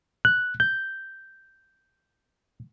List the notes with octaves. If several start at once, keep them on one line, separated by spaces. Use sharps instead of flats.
F#6
G6